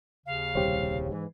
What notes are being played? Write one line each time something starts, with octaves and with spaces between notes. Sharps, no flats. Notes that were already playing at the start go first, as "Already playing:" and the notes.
D#2 C#3 F5
D#1 C2 G4 C5 C#5
G#2 E3